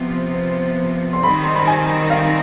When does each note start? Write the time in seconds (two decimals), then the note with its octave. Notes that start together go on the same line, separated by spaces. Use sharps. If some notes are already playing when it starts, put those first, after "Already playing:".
Already playing: C3 F3 B3 F4
1.13 C6
1.23 D#3 G3 C4 D#4 B5
1.43 C6
1.55 B5
1.67 G#5
2.10 F5